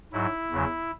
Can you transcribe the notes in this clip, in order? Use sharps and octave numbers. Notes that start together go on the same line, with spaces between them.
G#2 F#3 E4
E2 C#3 F#3